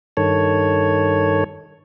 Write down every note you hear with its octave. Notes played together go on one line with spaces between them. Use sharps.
G2 D#3 A4 C#5